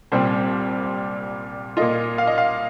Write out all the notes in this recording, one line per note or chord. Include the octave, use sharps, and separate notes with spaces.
C2 A#2 G3 C4 C5
A#2 A#3 F4 D#5
F5
D#5
F5